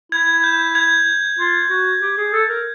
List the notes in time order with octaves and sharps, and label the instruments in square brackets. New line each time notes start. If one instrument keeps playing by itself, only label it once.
[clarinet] E4 [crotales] G#6
[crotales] G6
G#6
[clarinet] F4
F#4
G4
G#4
A4
A#4